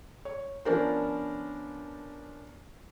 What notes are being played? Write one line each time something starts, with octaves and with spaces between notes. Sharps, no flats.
C#5
F3 B3 C#4 D4 A#4 C5